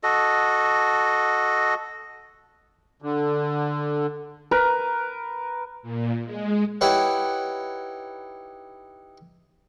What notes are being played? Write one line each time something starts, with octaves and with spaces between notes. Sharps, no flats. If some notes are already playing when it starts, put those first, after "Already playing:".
F#4 A4 D#5
D3
A#4 B4 A#5
A#2
G#3
D#4 E4 G4 B4 C#5 F#5